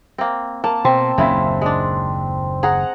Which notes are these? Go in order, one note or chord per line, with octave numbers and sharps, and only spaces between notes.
A#3 C4
A#3 A5
B2 C4
F#1 D#2 A#2 C#3 E4
G#3 D4
G#4 F#5 A#5